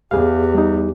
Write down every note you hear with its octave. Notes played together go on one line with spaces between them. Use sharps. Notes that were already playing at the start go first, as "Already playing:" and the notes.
E2 G4 G#4 F5
G3 D#4